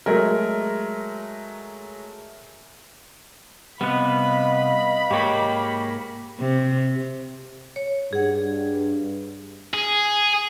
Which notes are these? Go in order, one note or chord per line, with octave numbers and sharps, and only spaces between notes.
F#3 G#3 A3 A#4
C3 G3 B3 B4 D#5 F5 B5
G#2 A#3 G4 C#5 G5
C3
C#5
G2 G#4 F#5
G#4